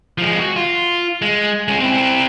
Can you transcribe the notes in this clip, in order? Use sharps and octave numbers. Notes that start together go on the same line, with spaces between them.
F3 G#3
F#4
F4
G#3
G#3 C#4
C4 E4